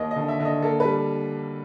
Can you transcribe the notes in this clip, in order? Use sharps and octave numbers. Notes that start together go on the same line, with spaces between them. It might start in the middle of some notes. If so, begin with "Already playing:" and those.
Already playing: D#2 D#5
D#5
D3
E5
D3
D#5
A#3 A4
G3 B4